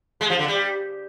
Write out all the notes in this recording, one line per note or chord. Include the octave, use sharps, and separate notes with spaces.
G#3
F3
D3
G3